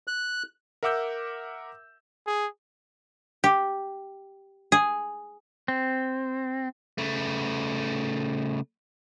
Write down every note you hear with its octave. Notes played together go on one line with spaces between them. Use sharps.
F#6
A#4 E5 F#5 D6 E6 G6
G#4
G4
G#4
C4
C#3 A3